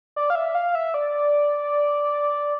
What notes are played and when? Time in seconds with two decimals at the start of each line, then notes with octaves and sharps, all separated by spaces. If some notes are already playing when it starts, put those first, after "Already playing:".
0.16 D5
0.30 F5
0.35 E5
0.55 F5
0.75 E5
0.94 D5